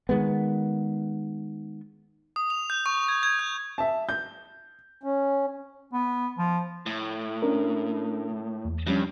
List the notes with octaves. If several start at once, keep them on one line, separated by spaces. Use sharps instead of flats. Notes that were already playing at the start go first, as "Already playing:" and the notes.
D#3 G#3 B3
D#6
F7
G6
C#6
G#6
G#6
G6
E5 A5
G6
C#4
B3
F3
A2
C#4 D4 A#4
E2
G2 F3 G3 C#4